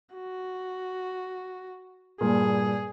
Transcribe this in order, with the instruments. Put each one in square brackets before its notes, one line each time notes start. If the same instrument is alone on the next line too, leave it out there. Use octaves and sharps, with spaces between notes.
[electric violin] F#4
[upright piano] G2 A#2 [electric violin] G#4